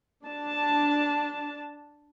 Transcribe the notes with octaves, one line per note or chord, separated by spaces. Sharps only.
D4 A5